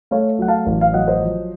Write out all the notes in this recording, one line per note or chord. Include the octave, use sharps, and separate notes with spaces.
A3 C#5 F5
F#3 F#5
F5 A5
A1
F5
F#3 D#5 F#5
C5 D#5
F3